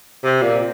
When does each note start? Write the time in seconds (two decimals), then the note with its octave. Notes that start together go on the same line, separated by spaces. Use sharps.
0.25 C3
0.42 A#2